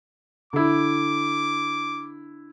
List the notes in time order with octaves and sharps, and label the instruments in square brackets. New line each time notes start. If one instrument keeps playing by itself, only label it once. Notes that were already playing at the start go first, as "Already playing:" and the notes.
[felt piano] D3 E4 [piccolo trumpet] D6